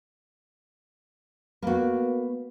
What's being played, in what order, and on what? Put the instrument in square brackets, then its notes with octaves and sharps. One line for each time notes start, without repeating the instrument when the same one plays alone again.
[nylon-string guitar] A#3 F#4 [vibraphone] B3 B4